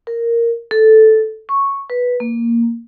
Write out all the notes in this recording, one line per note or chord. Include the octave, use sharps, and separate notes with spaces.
A#4
A4
C#6
B4
A#3